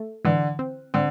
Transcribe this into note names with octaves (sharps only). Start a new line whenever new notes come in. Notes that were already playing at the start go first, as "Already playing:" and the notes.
Already playing: A3
D3 E3
C4
D3 C4